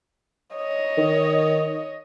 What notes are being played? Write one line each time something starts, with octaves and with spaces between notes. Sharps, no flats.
C#5 D#5
D#3